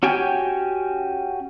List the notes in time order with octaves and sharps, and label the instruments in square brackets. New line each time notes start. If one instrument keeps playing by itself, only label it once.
[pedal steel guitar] C#4 F#4 G4 G5 G#5